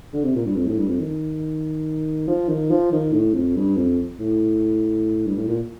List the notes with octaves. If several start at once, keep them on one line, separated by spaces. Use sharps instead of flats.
D3
C3
A#2
G2
F2
A2
G2
F2
D#3
F3
D#3
F3
D#3
A2
F2
G2
F2
A2
G2
A2
A#2